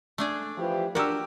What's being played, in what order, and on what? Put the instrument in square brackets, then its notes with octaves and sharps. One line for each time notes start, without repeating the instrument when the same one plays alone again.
[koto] A3 D4 G#4
[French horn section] E3 F3 G4
[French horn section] D4 [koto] F#4 G4 [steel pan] A#4 E6